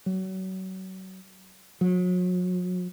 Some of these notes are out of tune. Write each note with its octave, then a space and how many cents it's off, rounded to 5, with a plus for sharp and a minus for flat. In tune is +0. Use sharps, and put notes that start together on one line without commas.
F#3 +30
F#3 -40